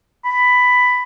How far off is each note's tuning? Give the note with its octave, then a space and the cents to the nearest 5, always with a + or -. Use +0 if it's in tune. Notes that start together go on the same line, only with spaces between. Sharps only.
B5 +10